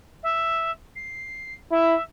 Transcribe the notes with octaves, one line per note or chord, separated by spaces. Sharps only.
E5
C7
E4 E5